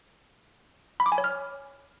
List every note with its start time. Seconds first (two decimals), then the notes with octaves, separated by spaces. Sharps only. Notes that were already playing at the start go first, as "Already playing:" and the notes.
1.00 B5
1.06 D6
1.12 G#5
1.18 C#5
1.24 F6